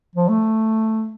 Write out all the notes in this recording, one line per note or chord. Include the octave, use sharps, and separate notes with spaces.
F3
A3